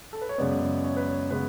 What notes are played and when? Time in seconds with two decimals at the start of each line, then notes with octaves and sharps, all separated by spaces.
0.13 A4
0.21 B4
0.29 C#5
0.38 F#2 C#3 G#3 B3 D5
0.84 C#5
0.97 B4
1.09 C#5
1.31 C#3 G#3 B3 B4